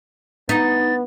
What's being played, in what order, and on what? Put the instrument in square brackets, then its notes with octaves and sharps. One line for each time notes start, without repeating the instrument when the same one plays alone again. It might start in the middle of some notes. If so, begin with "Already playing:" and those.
[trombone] B3 [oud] D#4 [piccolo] A6